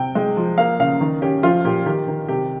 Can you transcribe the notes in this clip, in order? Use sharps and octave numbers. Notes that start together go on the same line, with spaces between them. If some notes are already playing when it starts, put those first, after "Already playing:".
Already playing: C3 G5
G#3
F3
A#3 F5
C#3 F5
D#3
C#4 G4
F3 F4
A#2 G4
D#3 G4
D#3
C3 G4